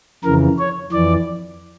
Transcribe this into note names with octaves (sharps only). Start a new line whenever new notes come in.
F2 C#3 E3 A#4
C#5
F2 E3 D5